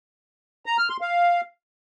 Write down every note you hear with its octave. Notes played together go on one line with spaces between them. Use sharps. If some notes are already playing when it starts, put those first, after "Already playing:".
A#5
F6
C6
F5